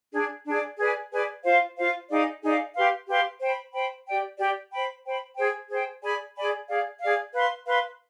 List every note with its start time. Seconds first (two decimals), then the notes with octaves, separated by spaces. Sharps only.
0.13 D4 G#4 D5
0.46 D4 G#4 D5
0.78 G#4 B4 D5 G#5
1.12 G#4 B4 D5 G#5
1.44 F4 C5 F5
1.77 F4 C5 F5
2.09 D#4 G#4 D5 F5
2.42 D#4 G#4 D5 F5
2.75 G4 B4 F5 C6
3.08 G4 B4 F5 C6
3.40 C5 G5 B5
3.73 C5 G5 B5
4.06 G4 D5 G5
4.38 G4 D5 G5
4.71 C5 G5 B5
5.05 C5 G5 B5
5.37 G#4 C5 G5
5.69 G#4 C5 G5
6.02 G#4 D5 G#5 B5
6.35 G#4 D5 G#5 B5
6.68 G#4 D5 F5
7.00 G#4 D5 F5
7.33 B4 F5 C6
7.66 B4 F5 C6